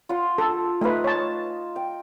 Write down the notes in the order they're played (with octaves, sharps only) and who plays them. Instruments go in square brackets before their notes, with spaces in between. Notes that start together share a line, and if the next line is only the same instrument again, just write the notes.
[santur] F4 F#5 C6
[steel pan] A4
[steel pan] A3 B4 [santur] D#4 F5
[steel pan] C#5 A5
[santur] G5